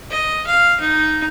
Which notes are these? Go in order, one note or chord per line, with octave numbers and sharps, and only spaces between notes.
D#5
F5
D#4